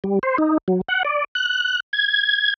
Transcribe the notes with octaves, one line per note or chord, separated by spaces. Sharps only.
G3
C5
D#4
F#3
F#5
D5
F#6
G#6